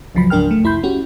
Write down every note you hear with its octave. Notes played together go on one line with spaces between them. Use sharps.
G1 C#2 F3 F#3 B5
C#2 G#2 D4 A#4 G5 F6
A3
C2 F2 E4 B5 C6 G6
C#4 F#4 G4